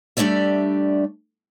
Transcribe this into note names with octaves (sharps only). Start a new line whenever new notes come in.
G3 A3 D4 G4 D5 E5